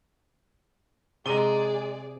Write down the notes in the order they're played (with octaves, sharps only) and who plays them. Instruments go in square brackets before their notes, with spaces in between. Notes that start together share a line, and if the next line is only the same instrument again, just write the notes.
[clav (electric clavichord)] C3 A#5 [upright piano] G#3 D#7 G7 [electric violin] G#4 D5